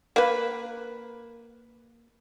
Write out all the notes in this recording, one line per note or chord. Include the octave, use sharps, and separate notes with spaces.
A#3 B4